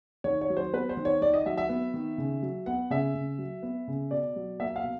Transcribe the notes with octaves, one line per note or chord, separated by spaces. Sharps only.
D#3 C#5
C#5
F#3
C5
B3 B4
C5
D#3
C#5
D#3 D5
D#5
F#3 E5
E5
B3
D#3
C#3
F#3
B3 F#5
C#3 E5
C#3
F#3
B3
C#3
B2 D5
F#3
A#3 E5
F5
B2